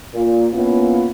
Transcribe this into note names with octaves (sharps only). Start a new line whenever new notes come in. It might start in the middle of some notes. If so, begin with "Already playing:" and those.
A#2
A#3 B3 C#4 E4 F4